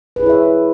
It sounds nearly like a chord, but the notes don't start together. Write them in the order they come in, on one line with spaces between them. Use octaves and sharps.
B4 G#4 E4 C#5 E5